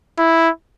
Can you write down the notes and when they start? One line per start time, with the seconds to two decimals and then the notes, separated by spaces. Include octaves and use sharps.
0.18 E4